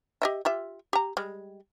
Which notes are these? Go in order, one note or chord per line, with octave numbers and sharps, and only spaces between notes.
G4 D#5 E5
F4 G4 E5
G4 A#5
G3 G#3